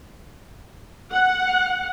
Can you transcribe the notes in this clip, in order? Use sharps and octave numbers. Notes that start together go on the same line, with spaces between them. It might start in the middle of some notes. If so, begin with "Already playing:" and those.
F#5